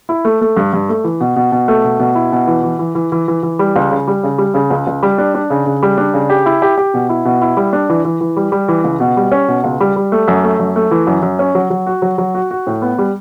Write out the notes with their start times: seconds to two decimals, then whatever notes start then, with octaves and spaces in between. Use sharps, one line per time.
0.09 E4
0.25 A3
0.41 A3
0.57 G2
0.73 G2
0.89 A3
1.04 E3
1.20 B2
1.36 B2
1.52 B2
1.68 A3
1.84 B2
1.99 B2
2.15 E4
2.32 B2
2.47 E3
2.63 E3
2.79 E3
2.95 E3
3.12 E3
3.28 E3
3.43 E3
3.59 G3
3.76 C#2
3.91 C#3
4.07 G3
4.23 C#3
4.38 G3
4.54 C#3
4.70 C#2
4.87 C#2
5.03 G3
5.18 D4
5.35 D4
5.50 C#3
5.66 C#3
5.83 G3
5.98 D4
6.14 C#3
6.30 G4
6.46 E4
6.62 G4
6.77 G4
6.94 B2
7.09 E4
7.25 B2
7.41 E4
7.57 G3
7.73 D4
7.89 E3
8.05 E3
8.21 E3
8.37 G3
8.52 G3
8.68 E3
8.84 C#2
9.00 B2
9.17 G3
9.32 C#4
9.48 B2
9.64 C#2
9.80 G3
9.96 G3
10.12 A3
10.28 F#2
10.43 A3
10.59 F#2
10.76 A3
10.91 E3
11.07 F#2
11.22 F#2
11.39 C#4
11.55 F#3
11.70 F#3
11.87 F#4
12.02 F#3
12.18 F#3
12.35 F#4
12.51 F#4
12.67 A2
12.82 B3
12.98 G3